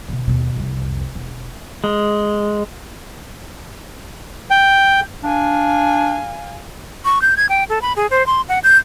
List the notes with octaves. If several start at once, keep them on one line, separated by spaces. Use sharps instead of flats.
B2 D3
D#2 B2
C2 F2
E1
G#3
G5
D4 F5 G#5
C#6
G6
G#6
G5
A4
B5
G#4
C5
C6
F#5
G6